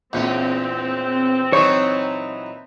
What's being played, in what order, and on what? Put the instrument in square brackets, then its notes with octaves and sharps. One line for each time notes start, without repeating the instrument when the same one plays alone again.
[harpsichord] A#1 [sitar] E2 C#4 [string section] C4
[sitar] E3 F#3 D#4 [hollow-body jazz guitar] C#5